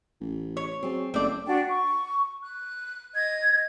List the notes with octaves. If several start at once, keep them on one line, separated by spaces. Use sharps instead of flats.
A1
C#5
F#3 C4 G#4 D5
F#1 A3 C4 D5
D4 F#4 G5
C#6
F#6
D#5 G#6